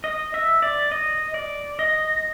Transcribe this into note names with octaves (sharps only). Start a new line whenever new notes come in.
D#5
E5
D5
D#5
D5
D#5